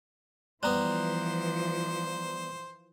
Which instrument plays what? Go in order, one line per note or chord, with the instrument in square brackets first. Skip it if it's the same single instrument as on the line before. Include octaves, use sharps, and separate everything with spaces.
[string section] E3 F3 [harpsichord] G3 B3 [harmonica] C5 [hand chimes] A#5 F#6